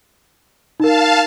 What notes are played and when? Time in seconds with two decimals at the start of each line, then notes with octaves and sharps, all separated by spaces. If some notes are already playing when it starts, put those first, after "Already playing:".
0.80 D#4 A#4 F5 A5